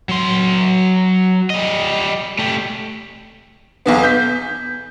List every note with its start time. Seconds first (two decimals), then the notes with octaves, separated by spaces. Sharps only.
0.09 F#3 C6
1.50 G3 D#5
2.39 A3 G4
3.86 B1 E2 B3
4.03 G6 B6